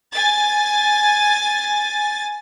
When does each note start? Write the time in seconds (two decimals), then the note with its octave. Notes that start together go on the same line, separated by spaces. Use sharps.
0.12 G#5 A6